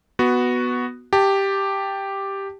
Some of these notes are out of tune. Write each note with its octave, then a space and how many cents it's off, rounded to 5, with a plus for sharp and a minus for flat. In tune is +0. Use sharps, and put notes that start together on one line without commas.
B3 +0 F#4 +0
G4 +0 A5 +5